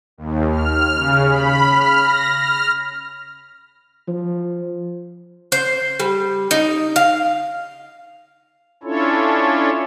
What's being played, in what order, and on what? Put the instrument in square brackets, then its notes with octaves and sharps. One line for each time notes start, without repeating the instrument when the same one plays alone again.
[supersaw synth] D#2
F6
C#3
B5
F6
A#6
F6
[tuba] F3
[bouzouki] C5
G3
D#4
F5
[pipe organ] C#4 D4 E4 F4 A4 C#5